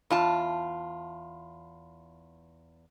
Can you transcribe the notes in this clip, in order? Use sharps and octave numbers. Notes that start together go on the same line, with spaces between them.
E2 F4 A5